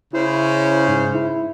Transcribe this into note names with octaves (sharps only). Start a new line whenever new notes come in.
C#3 C#4 E4 C5
G#2
E4